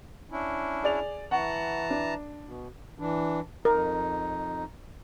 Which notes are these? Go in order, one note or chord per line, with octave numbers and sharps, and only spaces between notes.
C#4 D4 E4
G#4 D5 F7
E3 F#5 A5 A#5 C#6
D4
B2
E3 D4
F2 D#4 A#4